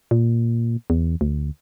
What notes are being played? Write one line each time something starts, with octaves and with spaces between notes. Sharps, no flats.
A#2
E2
D2